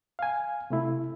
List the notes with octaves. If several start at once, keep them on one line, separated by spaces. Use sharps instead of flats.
F5 G#5
C3 A3 E4